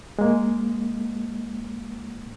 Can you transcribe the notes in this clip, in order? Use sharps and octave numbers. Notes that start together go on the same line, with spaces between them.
G#3 A#3